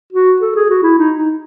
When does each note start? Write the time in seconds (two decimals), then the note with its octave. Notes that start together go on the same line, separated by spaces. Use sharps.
0.13 F#4
0.41 A4
0.55 G#4
0.70 F#4
0.83 E4
0.98 D#4
1.16 D#4